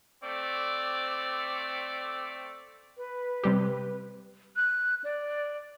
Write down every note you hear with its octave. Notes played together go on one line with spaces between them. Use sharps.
A3 C4 D5
B4
C3 G3 G4
F#6
D5